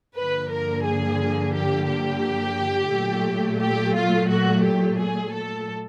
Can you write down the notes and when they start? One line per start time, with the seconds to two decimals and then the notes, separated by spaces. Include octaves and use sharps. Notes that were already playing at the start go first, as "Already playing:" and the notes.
0.15 G2 D3 F3 A#3 B4
0.50 A#4
0.85 G#4
1.54 G4
1.89 G4
2.92 A#2 F#3 A3
3.60 G4
3.96 F4
4.30 F#4
4.64 G4
4.99 G#4
5.33 A4